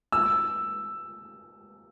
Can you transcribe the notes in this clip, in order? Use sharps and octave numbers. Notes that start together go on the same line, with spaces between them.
E6